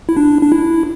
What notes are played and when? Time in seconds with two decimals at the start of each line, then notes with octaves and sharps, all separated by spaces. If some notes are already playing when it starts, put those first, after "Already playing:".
0.09 E4
0.17 D4
0.43 D4
0.52 E4